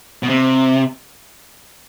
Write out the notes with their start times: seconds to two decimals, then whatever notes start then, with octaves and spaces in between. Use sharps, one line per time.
0.23 B2
0.29 C3